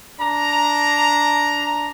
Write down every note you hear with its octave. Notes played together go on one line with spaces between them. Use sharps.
D4 A#5